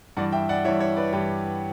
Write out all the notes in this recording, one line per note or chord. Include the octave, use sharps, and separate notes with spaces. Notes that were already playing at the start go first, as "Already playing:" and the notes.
G2 E3 D5 F#5
E5 G5
D5 F#5
G2 E3 C#5 E5
C#5 E5
B4 D5
G2 E3 G4 B4